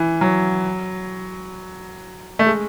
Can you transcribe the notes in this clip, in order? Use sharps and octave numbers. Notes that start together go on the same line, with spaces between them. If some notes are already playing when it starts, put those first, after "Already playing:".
Already playing: E3
F#3
A3
G#3